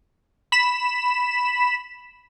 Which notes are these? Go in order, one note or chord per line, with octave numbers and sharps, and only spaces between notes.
B5 B6 E7